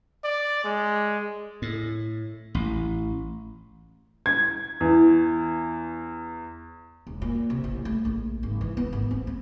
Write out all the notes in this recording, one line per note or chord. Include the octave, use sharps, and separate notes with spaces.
D5
G#3
A2
A1
G#6
E2
E1
A#2
C3
A1
A3
A#1
G#1
E3
B3
G#1
C4
C4